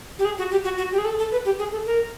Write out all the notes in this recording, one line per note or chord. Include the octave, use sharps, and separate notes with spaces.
G4
G#4
F#4
G4
F#4
F#4
G4
G#4
A4
A4
B4
G4
G#4
A4
A#4